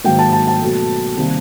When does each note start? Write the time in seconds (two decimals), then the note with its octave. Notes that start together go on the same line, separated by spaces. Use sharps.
0.04 G#2 D#3 F#3 A#3 G5
0.19 A5
0.33 A5
0.47 A5
0.61 B2 F#3 A3
1.16 C3 D#3 G3 A#3